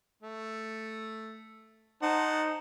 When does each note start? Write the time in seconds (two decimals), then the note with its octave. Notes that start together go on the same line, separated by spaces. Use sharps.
0.23 A3
2.02 D#4 C5 F#5 A5